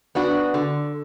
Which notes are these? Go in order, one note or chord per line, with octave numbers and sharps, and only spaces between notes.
B3 D4 F#4
D3